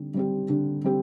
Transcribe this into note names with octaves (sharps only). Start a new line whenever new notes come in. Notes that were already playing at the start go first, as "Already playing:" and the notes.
Already playing: D3 G3 C4
G3 C4 G4
D3
G3 C4 G4